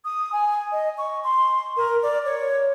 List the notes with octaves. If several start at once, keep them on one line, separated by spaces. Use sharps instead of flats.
D#6
G#5
D#5
C#6
C6
A#4
D5
C#5